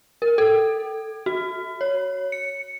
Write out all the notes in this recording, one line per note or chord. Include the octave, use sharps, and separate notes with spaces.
A#4
A4
F#4
C#5
C#7